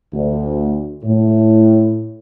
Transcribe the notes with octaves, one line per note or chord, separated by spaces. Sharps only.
D2
A2